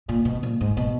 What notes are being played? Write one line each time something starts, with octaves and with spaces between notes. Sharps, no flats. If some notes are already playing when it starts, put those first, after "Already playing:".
A#2
B2
A#2
G#2
B2